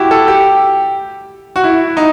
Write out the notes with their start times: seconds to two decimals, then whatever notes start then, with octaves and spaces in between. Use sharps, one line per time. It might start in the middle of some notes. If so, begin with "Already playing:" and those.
Already playing: E4 F#4 G4
0.11 A4
0.28 G4
1.56 F#4
1.64 E4
1.97 D#4